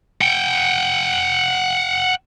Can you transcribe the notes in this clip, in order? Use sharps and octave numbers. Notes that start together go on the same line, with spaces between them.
F#5 G5